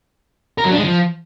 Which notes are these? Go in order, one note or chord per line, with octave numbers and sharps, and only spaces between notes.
A#4
F#3
D4
G#3
F3